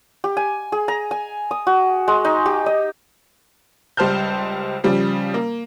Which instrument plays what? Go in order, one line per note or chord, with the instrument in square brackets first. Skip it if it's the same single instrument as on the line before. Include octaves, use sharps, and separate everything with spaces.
[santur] G4
G#5
G#4
A#5
G#5
D#6
F#4
G#3
D#4
G4
D#5
[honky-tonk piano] C#2 G3 C5 A5 F6 G6
C#3 F3 G3
A#3